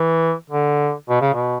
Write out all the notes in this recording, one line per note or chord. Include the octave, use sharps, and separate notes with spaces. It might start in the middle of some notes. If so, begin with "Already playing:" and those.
Already playing: E3
D3
B2
C#3
B2